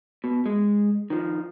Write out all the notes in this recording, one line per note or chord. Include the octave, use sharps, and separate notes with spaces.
B2
G#3
D#3 F3